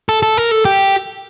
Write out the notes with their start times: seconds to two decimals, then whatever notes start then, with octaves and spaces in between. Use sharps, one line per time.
0.09 A4
0.23 A4
0.38 A#4
0.51 A4
0.65 G4